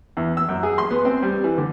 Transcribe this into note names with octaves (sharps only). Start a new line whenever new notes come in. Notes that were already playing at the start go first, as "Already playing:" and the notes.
E2
E6
F#2
G#4
C6
B3
C4
G3
E3
D3